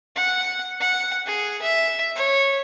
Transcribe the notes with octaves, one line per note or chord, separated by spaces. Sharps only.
F#5
F#5
G#4
E5
C#5